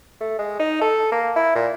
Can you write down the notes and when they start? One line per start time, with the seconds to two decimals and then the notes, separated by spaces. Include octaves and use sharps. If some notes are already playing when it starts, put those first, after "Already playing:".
0.21 A3
0.39 G#3
0.59 D#4
0.81 A4
1.12 A#3
1.36 E4
1.55 A#2